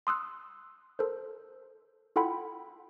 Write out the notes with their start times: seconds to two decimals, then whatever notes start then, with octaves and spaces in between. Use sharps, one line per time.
0.07 C6 D#6 E6 F#6
0.99 A4 A#4 C5
2.16 E4 F4 A4 F#5 G5 B5